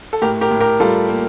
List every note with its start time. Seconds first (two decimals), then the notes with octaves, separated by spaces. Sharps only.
0.13 A4
0.22 A2 G4 A#4
0.41 G4 A#4
0.51 A2
0.60 G4 A#4
0.80 G3 F4 A4
1.09 A#3